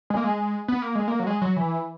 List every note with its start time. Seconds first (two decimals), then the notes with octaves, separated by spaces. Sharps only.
0.10 G#3
0.17 A#3
0.24 G#3
0.68 B3
0.82 A#3
0.95 G#3
1.08 A#3
1.20 F#3
1.27 G#3
1.42 F#3
1.56 E3